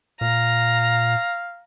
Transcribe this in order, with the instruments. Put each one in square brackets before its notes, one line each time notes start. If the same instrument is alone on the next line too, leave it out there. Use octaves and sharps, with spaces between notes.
[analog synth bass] A#2 [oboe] F5 [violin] A#5